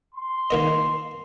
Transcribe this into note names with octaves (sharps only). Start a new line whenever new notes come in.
C6
D#3 A#3 D#5